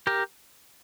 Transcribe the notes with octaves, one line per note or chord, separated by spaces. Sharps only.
G4 A#4